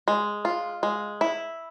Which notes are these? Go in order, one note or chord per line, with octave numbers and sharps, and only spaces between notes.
G#3
F4
G#3
E4